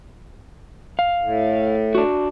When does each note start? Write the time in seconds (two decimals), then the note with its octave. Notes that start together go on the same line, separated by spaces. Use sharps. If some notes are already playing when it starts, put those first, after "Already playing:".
0.99 F5
1.22 A2
1.95 D4 F#4